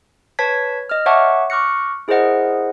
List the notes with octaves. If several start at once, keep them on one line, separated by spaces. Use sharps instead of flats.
B4 C#5 A5 G#6 B6
D#5 F6
C#5 E5 F#5 A5 C#6 D6
C#6 D6 F6 F#6 A#6 C#7
E4 G#4 A#4 C5 D#5 F#5